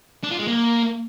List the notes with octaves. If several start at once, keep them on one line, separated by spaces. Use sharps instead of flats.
D4
F4
G#3
A#3